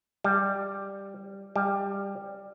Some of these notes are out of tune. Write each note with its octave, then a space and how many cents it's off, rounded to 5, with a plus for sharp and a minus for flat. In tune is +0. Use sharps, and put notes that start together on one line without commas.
G3 +5
G3 +15